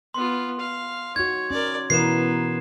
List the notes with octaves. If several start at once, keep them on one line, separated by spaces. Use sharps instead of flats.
B3 F4 C6
F5
D#4 F#4 C#5 G#6
C#4 A#4 D5
B2 E3 B3 A#4 C7 E7